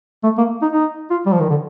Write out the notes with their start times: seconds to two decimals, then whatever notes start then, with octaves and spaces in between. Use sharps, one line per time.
0.24 A3
0.38 A#3
0.62 D#4
0.73 D#4
1.11 F4
1.26 G3
1.32 F3
1.40 D#3
1.50 D3